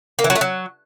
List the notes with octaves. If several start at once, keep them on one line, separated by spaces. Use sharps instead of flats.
A#3
E3
F#3
A3
F#3